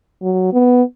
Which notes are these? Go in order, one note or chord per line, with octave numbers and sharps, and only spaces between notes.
F#3
B3